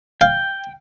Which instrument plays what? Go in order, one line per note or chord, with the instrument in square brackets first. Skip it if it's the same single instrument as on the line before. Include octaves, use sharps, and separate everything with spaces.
[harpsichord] F5 [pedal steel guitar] G5